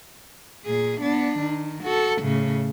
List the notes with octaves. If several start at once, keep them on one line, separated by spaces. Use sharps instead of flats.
A#2 G#4
B3 D4
D#3
F#4 A4
A2 C#3